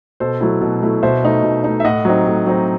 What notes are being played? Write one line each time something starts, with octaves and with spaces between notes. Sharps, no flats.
B2 A4 C5
F#3 A3 E4
B2
F#3 A3 E4
B2 C5 E5
A3 D#4
B2
A3 D#4
E5
A2 D#5 F#5
F#3 C4 D#4
A2
F#3 C4 D#4